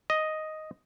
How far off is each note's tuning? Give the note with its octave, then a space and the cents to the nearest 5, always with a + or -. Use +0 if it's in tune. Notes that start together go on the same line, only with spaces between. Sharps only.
D#5 +5